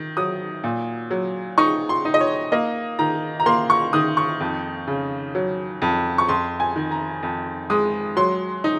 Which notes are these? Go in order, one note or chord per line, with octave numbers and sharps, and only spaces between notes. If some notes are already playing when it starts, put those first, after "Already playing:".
Already playing: D#3
F#3 D#6
A#2
F#3
D#4 C#6
C6
D#4
D#5
C#5
A#3 D#5
D#3 A#5
A#5
A#3 C6
C#6
D#3 D#6
C#6
F2
C#3
F#3
F2
C#6
F2 C6
G#5
D#3
A#5
F2
G#3 D#6
F#3 C6
D#4